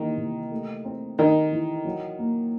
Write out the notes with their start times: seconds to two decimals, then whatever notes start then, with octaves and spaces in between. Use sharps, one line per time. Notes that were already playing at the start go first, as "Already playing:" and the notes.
Already playing: D#3 E3 G3 A#3
0.17 C3
0.51 A3
0.85 C4
1.18 D#3 D#4
1.52 E3
1.85 F#3
2.19 A#3